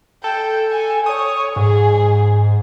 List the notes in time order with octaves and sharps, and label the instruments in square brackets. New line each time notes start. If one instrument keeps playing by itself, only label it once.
[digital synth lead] A4 [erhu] G5
[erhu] G#5
[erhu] C#5 [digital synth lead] D#6
[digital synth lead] G#2 [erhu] G#4